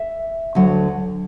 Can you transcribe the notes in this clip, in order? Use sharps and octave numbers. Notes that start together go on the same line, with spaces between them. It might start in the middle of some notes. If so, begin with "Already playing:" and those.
Already playing: E5
D2 D3 F#3